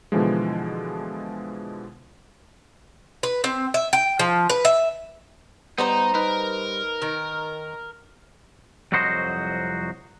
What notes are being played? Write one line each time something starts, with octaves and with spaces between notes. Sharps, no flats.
B2 D3 E3 F3 G#3
B4
C4
E5
G5
F3
B4
E5
G3 B3 D#4 C5 A#5
D#4 A#4 B4
D#3
C2 F2 F#3 F#4 C5 D#5